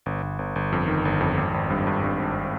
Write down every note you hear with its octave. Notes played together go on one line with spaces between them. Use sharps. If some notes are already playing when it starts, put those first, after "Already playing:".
G1
G1
G1
G1
F2
D#3
G1
F2
G#1
G#1
G2
G2
G2
G#1